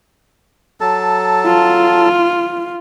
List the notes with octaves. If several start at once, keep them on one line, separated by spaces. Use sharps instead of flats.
F#3 A4 A5
F4